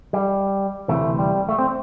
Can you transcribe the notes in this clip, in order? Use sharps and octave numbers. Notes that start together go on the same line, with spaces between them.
G3
D2 C3 E3 A3
G3
A3
C4